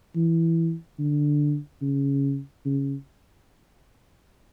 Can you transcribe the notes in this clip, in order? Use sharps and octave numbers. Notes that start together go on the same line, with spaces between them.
E3
D3
C#3
C#3